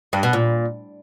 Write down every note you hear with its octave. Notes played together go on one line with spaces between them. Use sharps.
G2
B2
A#2